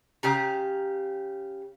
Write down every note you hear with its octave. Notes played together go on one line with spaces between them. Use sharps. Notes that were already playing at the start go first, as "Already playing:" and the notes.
C#3 G4 A#5